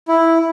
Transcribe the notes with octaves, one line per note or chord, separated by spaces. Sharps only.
E4